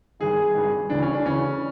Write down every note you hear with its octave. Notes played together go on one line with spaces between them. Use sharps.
G#1 G2 D#3 G#4
G#1 G2 D#3
D2 C#3 E3 D4
C#4
D4
D2 C#3 E3 C#4